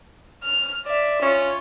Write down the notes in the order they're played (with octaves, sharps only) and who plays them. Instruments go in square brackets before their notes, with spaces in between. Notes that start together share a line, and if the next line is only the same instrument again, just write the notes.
[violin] F6
D5 E5
[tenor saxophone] C#4 [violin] F4